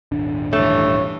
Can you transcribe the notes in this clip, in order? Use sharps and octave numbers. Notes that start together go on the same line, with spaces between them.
D#1 G#1 D4
G2 E3 A3 C#5